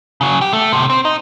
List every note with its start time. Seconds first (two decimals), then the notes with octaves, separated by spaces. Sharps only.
0.21 C#3 F#3
0.41 G4
0.53 A3
0.72 A2 C3
0.90 C4
1.05 D#4